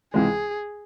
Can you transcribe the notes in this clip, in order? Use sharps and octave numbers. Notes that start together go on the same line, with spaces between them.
C#2 C3 E3 G#3 G#4